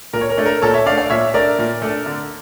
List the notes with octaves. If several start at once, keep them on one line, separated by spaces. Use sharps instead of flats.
A#2 A#4
C#5
A#4
A3 D4 C#5
A#4
A#2 A4 C#5
C#5 E5
A3 D4 D5 F5
D5 F5
A#2 C#5 E5
A3 D4 A#4 D5
A#2
A3 D4
D3